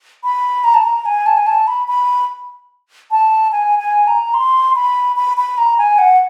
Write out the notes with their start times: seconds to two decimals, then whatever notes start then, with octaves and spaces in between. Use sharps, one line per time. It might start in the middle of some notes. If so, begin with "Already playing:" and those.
0.24 B5
0.64 A#5
0.74 A5
0.84 A#5
1.05 G#5
1.26 A5
1.37 G#5
1.47 A5
1.67 B5
1.88 B5
3.11 A5
3.52 G#5
3.79 G#5
4.07 A#5
4.34 C6
4.75 B5
5.16 B5
5.37 B5
5.58 A#5
5.78 G#5
5.98 F#5